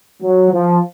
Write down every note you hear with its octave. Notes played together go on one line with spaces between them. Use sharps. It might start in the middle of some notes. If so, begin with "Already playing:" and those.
F#3
F3